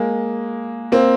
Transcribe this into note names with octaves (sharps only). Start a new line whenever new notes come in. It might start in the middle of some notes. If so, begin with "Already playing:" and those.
Already playing: G#3 A#3
A#3 C4